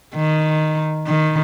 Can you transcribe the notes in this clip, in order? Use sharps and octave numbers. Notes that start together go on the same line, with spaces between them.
D#3
D#3